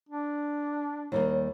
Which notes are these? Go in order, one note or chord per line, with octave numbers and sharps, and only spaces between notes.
D4
D#2 G3 A#3